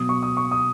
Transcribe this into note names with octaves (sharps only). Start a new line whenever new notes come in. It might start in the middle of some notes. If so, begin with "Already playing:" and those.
Already playing: B2 F#3 B3 D#6
C#6
D#6
C#6
D#6